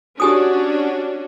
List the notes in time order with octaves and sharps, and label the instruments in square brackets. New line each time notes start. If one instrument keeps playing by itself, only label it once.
[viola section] C#4 D4 F#4 [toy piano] G4 G#5 D#6